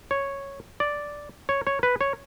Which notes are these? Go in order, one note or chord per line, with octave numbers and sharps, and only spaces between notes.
C#5
D5
C#5
C#5
B4
C#5